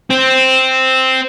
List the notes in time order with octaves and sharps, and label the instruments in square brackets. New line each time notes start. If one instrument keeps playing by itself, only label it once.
[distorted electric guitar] C4